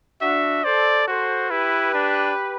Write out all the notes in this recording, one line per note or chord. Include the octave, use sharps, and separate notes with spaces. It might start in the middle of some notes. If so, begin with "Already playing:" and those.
D4 F#4 E5
A4 C5 D5
F#4 A4 C5
E4 G4 B4
D4